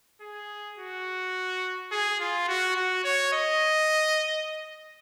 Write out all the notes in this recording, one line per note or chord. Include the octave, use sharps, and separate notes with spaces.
G#4
F#4
G#4
F4
F#4
F#4
C#5
D#5